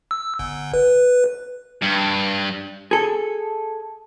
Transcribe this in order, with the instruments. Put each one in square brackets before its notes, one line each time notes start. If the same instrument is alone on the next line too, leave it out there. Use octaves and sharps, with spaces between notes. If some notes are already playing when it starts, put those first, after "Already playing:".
[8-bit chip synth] E6
G1
B4
[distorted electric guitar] G2
[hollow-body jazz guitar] G#4 A4